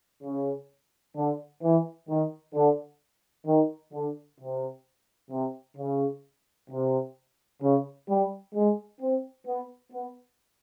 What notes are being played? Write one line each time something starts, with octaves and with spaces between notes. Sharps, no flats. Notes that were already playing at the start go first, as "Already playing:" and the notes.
C#3
D3
E3
D#3
D3
D#3
D3
C3
C3
C#3
C3
C#3
G3
G#3
C4
B3
B3